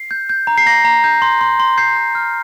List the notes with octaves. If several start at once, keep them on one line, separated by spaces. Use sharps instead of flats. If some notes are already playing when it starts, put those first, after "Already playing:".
Already playing: C7
G6
G6
A#5
C7
A#5 A#6
A#5
G6
C6
C6
C6
C6 G6 C7
C6
F6